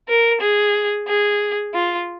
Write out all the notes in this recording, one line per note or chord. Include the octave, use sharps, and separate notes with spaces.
A#4
G#4
G#4
F4